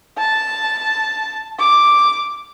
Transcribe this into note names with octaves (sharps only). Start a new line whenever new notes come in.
A5
D6